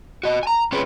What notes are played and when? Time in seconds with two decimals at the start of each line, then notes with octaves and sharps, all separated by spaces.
0.23 F#4 D#5
0.43 G#5 A#5
0.72 C4 C#4 F4 G#4 B4 C#5